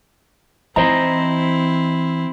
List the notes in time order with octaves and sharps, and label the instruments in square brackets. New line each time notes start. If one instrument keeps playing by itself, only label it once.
[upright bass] E3 [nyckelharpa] C4 E4 [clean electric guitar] C5 D#5 A#5